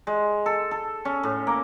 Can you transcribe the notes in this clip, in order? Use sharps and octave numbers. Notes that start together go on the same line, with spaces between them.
G#3
A4
A4
C#4
A2
A#3